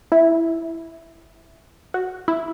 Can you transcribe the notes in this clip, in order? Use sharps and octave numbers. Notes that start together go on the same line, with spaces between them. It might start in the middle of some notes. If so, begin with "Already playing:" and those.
E4
F#4
E4